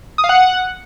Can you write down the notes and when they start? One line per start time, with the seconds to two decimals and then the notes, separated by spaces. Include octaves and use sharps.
0.18 D#6
0.24 F5
0.29 F#5